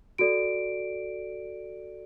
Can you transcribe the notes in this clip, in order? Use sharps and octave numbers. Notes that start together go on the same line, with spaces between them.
F#4 A4 D5 D7